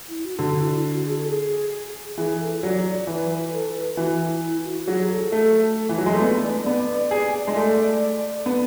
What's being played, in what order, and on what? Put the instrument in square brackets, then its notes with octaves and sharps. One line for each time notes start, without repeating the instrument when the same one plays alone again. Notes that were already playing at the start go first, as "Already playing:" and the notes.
[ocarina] E4
F#4
[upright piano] D3 [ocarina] F#4
[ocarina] E4
F#4
F#4
G#4
A4
G#4
[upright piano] E3 [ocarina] G#4
[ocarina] A4
[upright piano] F#3 [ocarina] D5
[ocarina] D5
[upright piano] E3 [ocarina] B4
[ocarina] A4
B4
[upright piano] E3 [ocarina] F#4
[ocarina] E4
E4
F#4
[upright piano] F#3 [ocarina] G#4
[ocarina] G#4
A4
[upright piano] A3
E3
F#3
G#3
A3
[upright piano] B3 [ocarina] D5
[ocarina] D5
[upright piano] B3 [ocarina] D5
[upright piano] G#4 [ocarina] D5
[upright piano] G#3
A3
B3